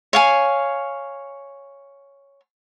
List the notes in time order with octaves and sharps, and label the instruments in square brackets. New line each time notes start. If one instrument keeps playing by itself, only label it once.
[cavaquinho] C#5 F5 G#5